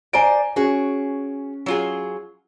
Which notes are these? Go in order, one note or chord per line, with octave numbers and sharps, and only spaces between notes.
C5 D5 G#5 A#5 D7
C#4 F#4 G#4
F#3 F4 G#4